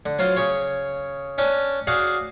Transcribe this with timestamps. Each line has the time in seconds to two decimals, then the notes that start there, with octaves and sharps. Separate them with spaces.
0.06 D3
0.19 F#3 F4 C5
0.36 C#3 C#5
1.38 C#4 D4 G5 A5
1.87 F#4 G#4 D5 F5 F#5